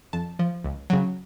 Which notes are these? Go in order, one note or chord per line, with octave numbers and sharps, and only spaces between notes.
F2 A5
F3
C#2
C#3 F#3